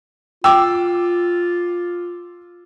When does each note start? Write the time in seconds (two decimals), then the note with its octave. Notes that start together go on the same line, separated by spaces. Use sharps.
0.44 F4 G5 D6 E6